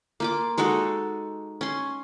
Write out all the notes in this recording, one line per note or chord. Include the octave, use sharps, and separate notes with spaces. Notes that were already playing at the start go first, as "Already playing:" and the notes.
A#3 F4 D6
G#3 D#4 F#4 A4
C#4 C6